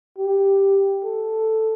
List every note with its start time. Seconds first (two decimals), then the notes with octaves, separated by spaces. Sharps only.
0.18 G4
1.04 A4